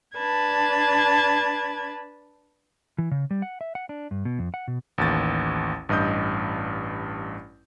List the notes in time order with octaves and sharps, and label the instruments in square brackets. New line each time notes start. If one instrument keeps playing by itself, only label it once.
[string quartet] D4 B4 A5 G#6
[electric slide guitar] E3
C#3
G3
F#5
E5
F#5
D4
G2
B2
F2
F#5
B2
[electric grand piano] A1 D#2 A6
A1 G2 D#5 D#6 G6